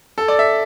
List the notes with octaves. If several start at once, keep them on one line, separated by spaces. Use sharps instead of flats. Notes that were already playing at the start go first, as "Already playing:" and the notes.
A4
D5
E5